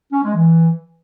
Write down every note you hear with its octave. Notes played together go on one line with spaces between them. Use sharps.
C#4
G#3
E3